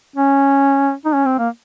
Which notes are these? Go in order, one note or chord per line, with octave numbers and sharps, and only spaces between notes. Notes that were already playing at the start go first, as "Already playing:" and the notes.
C#4
D#4
C#4
C4
A#3